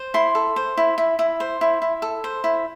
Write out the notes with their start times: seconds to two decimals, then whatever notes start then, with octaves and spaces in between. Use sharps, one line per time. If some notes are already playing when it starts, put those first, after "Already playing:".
Already playing: C5
0.14 E4 C6
0.35 A4
0.56 C5
0.77 E4
0.98 E4
1.19 E4
1.40 C5
1.61 E4
1.82 E4
2.02 A4
2.24 C5
2.44 E4